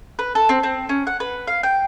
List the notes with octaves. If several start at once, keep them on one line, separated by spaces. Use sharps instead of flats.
B4
A4
C4
C4
C#4
F#5
B4
F5
G5